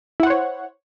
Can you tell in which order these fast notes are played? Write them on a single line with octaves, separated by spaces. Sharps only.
E4 F#5 C5 C#5